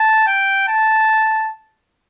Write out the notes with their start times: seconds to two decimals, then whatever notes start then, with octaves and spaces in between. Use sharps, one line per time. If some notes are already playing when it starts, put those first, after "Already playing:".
Already playing: A5
0.27 G5
0.68 A5